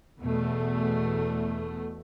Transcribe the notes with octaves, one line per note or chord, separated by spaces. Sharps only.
E2 B2 A3